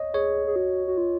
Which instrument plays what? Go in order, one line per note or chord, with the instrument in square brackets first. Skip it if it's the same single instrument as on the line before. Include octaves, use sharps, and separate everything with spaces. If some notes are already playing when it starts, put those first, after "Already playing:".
Already playing: [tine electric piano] C#5 D#5
[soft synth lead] G#4 [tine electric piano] C#5
[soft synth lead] G#4
F#4
F#4
F4